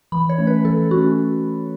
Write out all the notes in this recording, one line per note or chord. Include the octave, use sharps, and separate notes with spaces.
E3 B5
C#5
A3 C#4
B4
E3 A4
A3 C#4 F#4